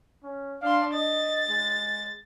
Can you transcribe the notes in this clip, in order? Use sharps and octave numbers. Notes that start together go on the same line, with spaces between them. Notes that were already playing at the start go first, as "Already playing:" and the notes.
C#4
D4 F5 C6
D#5 A6
G#3